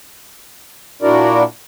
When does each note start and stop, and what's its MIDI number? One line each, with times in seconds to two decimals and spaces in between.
1.02 1.43 46
1.02 1.43 62
1.02 1.43 64
1.02 1.43 66
1.02 1.43 70
1.02 1.43 74